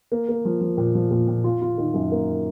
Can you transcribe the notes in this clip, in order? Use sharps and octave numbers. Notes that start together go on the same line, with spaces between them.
A#3
A#3
F3
F3
A#2
F3
A#2
A#2
F4
F4
D#3
F#2
A#3